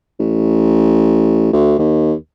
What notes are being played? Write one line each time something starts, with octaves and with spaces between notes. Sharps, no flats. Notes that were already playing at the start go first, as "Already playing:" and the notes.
A1
D2
D#2